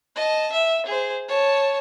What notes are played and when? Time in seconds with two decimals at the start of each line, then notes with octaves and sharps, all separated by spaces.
0.16 D#5 A5
0.53 E5
0.86 G#4 C5
1.28 C#5 A5